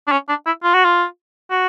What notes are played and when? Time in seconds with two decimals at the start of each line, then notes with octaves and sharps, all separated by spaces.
0.08 D4
0.12 C#4
0.29 D4
0.46 E4
0.63 F4
0.74 F#4
0.84 F4
1.51 F#4